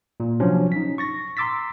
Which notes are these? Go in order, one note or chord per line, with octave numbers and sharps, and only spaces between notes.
A#2
C3 F3 F#3 C#4 D4
D#4 B6
C#6 A6 A#6
A#5 C6 D6 E6 A6 B6